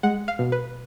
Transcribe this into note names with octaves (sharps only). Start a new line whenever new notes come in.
G#3 F#5
F5
B2
B4